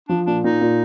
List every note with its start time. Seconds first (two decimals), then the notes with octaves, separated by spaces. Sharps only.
0.09 F3 D4
0.26 A#2 D4
0.44 A#2 D#4
0.61 A#2